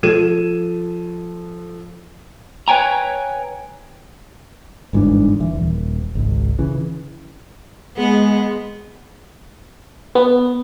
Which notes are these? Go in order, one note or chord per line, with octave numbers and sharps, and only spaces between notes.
F3 A4 G#6 D#7 E7
B4 C#5 G5 G#5 A#5
G1 G#2 E3 D4
D#1 E3
D#1
G#1 C#2
C#3 E3
G#3 B3
B3